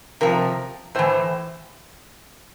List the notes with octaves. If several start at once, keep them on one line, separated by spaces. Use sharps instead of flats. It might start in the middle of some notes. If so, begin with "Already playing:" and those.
C3 F3 A#4
A2 E3 C5